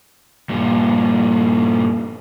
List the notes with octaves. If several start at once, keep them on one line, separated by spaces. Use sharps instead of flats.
G2 A#2